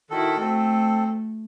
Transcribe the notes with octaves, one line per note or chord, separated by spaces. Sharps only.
D#3 E4 F#4 A4
A3 C4 A4